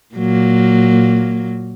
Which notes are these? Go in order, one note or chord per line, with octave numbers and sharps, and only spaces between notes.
A#2 F#3 A#3